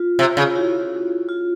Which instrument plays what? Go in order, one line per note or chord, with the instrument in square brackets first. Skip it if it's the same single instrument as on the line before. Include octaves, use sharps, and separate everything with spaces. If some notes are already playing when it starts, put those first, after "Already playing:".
Already playing: [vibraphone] F4
[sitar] C3
C#3
[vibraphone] E4 F#4
F4